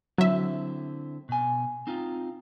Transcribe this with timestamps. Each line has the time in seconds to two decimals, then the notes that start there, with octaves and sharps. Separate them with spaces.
0.18 D3 F#3 C4 E4 E5
1.29 B2 G#5
1.87 C4 D#4 F4